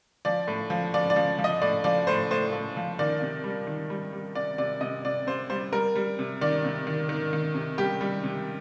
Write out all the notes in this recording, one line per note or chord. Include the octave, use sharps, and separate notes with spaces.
F3 D5
A2
F3
F3 D5
D5
F3
F3
D#5
A2 D5
F3 D5
A2 C5
A2 C5
A2
F3
D#3 D5
C3
G3
D#3
G3
G3
C3 D5
C3 D5
C3 D#5
C3 D5
C3 C5
G3 C5
G3 A#4
G3
C3
D#3 D5
C3
D#3
D#3
D#3
C3
G3 G4
G3
C3